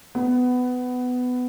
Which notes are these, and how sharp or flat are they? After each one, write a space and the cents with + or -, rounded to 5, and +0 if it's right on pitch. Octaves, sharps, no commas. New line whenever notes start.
B3 +15